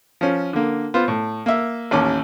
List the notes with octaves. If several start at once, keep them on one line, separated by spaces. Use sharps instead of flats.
F3 C#4
D3 A#3
B3 F4 C5
A2
A#3 E5
A1 D#2 C#4 D6